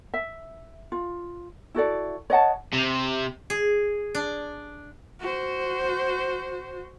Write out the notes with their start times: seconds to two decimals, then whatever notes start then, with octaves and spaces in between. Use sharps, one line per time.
0.14 E5
0.92 F4
1.75 E4 F#4 A4 D5
2.30 C#5 D#5 F#5 A5
2.73 C3
3.50 G#4
4.15 D4
5.20 F#4 C5